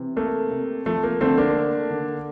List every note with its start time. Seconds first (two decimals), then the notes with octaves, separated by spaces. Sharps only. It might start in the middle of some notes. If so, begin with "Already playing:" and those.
Already playing: C3 E3
0.16 A3 A#3
0.51 C3
0.86 F3 A3
1.03 A#3
1.21 D3 A3 C4
1.38 A#3 D4
1.56 A3
1.91 D3